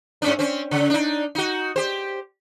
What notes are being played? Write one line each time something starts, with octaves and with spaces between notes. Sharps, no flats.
G#2 C#4 D4
C4 C#4
C#3
D4 D#4
D#4 F#4
G4 C5